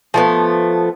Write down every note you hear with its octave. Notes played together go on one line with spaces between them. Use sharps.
F3 A3 B3